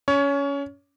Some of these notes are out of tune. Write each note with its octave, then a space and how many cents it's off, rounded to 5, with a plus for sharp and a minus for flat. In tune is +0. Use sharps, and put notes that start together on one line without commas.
C#4 +20 C#5 +20